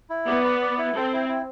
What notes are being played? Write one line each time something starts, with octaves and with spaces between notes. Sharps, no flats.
E4
B3 D5
B4
D5
E4
C4 A4
E4
E4